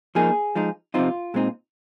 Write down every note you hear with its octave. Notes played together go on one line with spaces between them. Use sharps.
F3 A#3 D#4 G#4
F3 G#3 D#4
C3 F3 C4 D#4 F4
A#2 G#3 C4 D#4